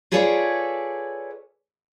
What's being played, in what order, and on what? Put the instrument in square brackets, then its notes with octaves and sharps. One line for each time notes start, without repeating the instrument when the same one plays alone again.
[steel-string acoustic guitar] F4 G#4 A4 B4 C#5 D5